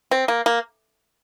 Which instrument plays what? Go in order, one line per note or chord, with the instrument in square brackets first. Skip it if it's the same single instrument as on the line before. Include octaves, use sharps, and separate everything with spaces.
[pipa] C4
A#3
A#3